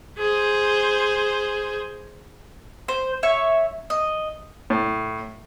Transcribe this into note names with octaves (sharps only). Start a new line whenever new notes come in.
G#4 C5
C5
C#5 E5 C#6
D#5
A2